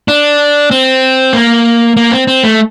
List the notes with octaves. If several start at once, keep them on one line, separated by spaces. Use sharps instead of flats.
D4
C4
A#3
A#3
C4
C4
A3